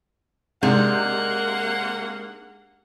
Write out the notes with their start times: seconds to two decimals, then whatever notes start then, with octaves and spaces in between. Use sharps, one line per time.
0.63 C3 G#3 A#3 D4 D#4 F#5